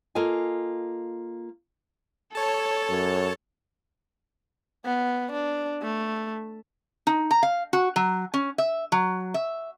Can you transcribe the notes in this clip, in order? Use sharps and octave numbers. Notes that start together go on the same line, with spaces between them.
A#3 F4 A4 D#5 G#5
A4 C#5 A5
F#2
B3
D4
A3
D#4
A#5
F5
F#4
F#3
C#4
E5
F#3
E5